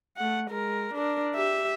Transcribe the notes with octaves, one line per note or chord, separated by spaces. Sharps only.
A3 F#5
G#3 A#4
D4 A#4
G4 E5